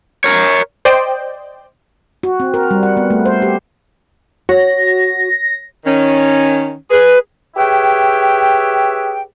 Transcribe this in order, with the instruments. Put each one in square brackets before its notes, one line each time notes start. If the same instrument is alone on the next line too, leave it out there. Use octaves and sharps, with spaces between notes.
[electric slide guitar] A#4 C#5
[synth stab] C5 D5 D#5 G5
[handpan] F#4
C4
A#4
G3
F#5
B3
A3
C5
G4
[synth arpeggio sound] F#4 [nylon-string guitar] C#5 [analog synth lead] A#6
[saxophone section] D#3 C#4
[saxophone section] G#4 [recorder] B4
[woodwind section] G4 G#4 B4 C#5 E5 G5